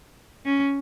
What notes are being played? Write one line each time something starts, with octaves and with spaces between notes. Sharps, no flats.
C#4